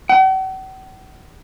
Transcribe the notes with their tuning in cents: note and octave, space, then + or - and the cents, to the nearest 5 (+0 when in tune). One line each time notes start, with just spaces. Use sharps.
F#5 +45